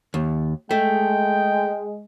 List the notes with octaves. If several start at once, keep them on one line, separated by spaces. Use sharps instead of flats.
D#2
G#3 A3 G5